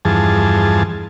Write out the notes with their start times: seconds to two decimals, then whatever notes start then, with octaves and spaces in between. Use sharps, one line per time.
0.05 E2 G2 F3 G#4 A5